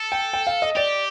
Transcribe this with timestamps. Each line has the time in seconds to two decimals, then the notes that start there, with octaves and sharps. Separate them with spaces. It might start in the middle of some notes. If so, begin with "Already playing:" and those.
Already playing: A4
0.12 G5
0.33 G5
0.47 F5
0.62 D#5
0.76 G4 D5